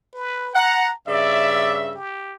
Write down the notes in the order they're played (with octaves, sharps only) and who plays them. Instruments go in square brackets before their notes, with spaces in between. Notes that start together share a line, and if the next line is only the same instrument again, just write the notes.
[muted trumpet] B4
[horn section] F#5 [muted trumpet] A#5
[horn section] G2 C#3 E5 [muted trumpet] D5
[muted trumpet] G4